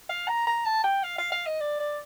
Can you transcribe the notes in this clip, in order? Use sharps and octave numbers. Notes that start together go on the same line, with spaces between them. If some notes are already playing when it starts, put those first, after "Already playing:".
F5
A#5
A#5
A5
G5
F5
F5
F5
D#5
D5
D5